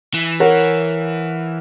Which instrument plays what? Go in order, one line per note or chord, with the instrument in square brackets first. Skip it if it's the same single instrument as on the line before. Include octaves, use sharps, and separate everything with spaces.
[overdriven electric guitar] E3
[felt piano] A#4 C#5 F#5